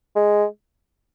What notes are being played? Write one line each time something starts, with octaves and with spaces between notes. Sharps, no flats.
G#3